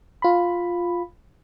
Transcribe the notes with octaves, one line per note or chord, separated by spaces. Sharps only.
F4 B5